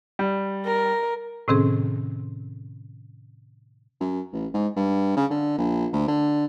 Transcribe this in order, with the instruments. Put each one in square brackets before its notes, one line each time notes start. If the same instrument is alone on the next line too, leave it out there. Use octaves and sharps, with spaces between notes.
[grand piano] G3
[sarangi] A#4
[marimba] A2 C3 D#3 C4 C#4 G#4
[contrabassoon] F#2
A1
G#2
G2
C#3
D3
A#1
D2
D3